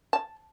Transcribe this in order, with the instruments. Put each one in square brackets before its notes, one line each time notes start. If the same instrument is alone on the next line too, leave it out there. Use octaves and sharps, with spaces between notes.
[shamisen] A5